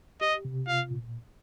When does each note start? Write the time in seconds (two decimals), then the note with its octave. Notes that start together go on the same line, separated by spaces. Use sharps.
0.21 G4 D#5
0.45 C3
0.67 F4 F5
0.91 A#2